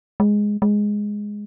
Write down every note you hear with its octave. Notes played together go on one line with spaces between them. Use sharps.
G#3
G#3